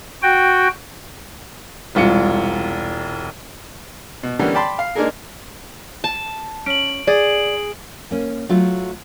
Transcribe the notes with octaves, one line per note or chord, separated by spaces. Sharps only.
F#4 G5
E1 C2 F4 C#7
B2
D3 E3 G3 A#3 B3 C#4
D5 G5 A5 B5 C6
F5
G#3 A#3 D4 D#4 G#4 A#4
A5
C#4 D7 F#7
G#4 D5
A#3 C#4
F#3 A3 F4